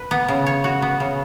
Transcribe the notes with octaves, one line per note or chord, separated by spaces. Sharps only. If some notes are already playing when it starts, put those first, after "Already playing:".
Already playing: B4
B3
C#3
C#5
F#4
B3
C#3